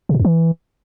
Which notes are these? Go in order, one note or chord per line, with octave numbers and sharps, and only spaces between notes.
C3
A#2
F2
E3